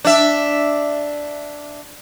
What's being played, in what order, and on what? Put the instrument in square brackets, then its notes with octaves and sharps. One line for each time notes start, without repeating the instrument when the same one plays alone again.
[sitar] D4 E5